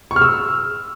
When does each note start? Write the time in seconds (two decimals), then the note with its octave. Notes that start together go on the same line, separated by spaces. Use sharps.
0.11 C#6
0.16 F6
0.21 E6